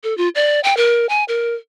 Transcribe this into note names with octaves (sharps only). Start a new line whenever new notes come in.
A4
F4
D5
G5
A#4
G#5
A#4